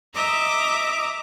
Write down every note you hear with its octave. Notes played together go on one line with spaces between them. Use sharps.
D#5 E5 A#5 D6